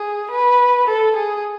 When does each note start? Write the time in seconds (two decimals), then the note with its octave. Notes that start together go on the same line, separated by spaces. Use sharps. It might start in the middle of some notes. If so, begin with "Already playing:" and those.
Already playing: G#4
0.31 B4
0.87 A4
1.16 G#4